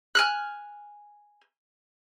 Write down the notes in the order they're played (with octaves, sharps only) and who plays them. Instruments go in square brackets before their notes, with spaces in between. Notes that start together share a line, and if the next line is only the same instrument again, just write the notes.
[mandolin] G#5 F6 F#6